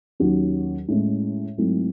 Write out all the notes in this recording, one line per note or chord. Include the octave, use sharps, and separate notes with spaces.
D#2 D#3 F#3 C#4 F#4
A2 G#3 C#4
G#2 F#3 A3 C4 E4